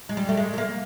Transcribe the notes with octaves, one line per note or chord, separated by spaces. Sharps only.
G#3
G3
A3
G#3
A3
A#3